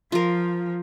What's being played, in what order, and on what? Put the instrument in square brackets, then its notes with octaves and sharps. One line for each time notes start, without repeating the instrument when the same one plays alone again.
[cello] F3 [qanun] F4 A#4